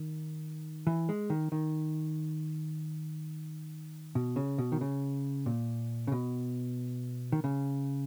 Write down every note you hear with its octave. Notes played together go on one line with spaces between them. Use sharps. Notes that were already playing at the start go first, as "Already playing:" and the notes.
Already playing: D#3
E3
G#3
D#3
D#3
B2
C#3
B2
D#3
C#3
A#2
C#3
B2
D#3
C#3